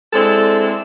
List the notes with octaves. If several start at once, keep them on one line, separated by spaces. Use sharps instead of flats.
G#3 C4 D4 E4 A4